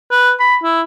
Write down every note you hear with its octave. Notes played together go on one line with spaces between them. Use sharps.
B4
B5
E4